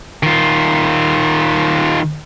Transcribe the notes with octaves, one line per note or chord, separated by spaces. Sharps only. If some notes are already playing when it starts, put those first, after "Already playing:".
D#3 F4